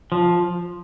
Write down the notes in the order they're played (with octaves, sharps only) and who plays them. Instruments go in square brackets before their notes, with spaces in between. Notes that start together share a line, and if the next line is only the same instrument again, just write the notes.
[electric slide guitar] F3